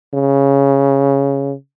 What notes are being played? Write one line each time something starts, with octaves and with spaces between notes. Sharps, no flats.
C#3